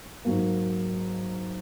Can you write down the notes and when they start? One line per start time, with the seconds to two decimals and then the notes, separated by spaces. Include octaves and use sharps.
0.25 G#2 F#3 A#3